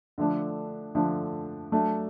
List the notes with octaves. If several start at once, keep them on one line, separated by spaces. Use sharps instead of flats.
D3 F3 A3 D4
D3 F3 A3 D4
F#3 A3 D4